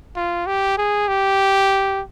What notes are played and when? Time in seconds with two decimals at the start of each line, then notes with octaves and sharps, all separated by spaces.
0.16 F4
0.47 G4
0.78 G#4
1.08 G4